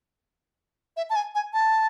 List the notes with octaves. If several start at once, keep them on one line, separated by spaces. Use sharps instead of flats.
E5
A5
G#5
G#5
A5